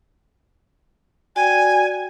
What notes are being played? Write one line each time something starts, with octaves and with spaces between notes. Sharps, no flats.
F#4 D5 G5 G#5